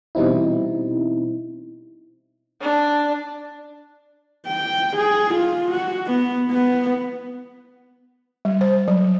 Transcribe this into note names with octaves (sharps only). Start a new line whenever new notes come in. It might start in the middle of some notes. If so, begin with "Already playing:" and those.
B2 E3 G3 C4 D#4 E4
D4
G5
G#4
F4
F#4
B3
B3
G3
C5
F#3